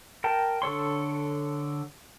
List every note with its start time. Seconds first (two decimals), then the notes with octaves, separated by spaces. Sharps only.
0.24 A#4 G5 A5
0.62 D3 A4 C#5 C6